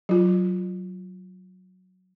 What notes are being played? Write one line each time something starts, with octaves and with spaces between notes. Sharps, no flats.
F#3 F4